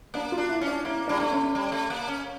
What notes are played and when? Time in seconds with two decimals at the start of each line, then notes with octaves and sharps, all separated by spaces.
0.14 A#3 D4
0.32 F4
0.38 D4
0.49 E4
0.61 C#4
0.67 D4
0.85 A#3 E4
1.08 G3 D4
1.20 A3 D4
1.31 C#4
1.55 G3
1.72 A3
1.90 A#3
2.08 C#4